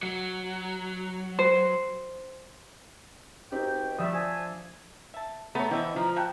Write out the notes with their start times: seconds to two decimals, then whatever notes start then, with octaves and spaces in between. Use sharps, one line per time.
0.03 F#3
1.39 C5
3.52 C#2 C4 D#4 F#4 G4 G5
3.99 F3 G3 A3 E5 D#6
4.13 D4 C5 G#5 A5
5.14 E5 A5
5.55 A3 B3 C#5 A#5
5.71 D3 E3 A3 C4 D#5
5.96 F3 A#5
6.16 F#4 F5 G5 A5